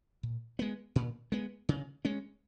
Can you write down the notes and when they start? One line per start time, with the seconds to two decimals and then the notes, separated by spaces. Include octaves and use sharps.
0.23 A#2
0.59 G#3 B3
0.96 A#2
1.32 G#3 B3
1.69 C#3
2.05 G#3 C#4